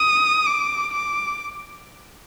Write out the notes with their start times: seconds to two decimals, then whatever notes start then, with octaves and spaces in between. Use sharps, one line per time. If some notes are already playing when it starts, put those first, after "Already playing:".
Already playing: D#6
0.47 D6
0.93 D6